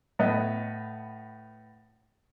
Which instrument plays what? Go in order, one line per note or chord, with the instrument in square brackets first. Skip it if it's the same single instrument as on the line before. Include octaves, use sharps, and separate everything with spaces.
[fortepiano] A2 B3 D#5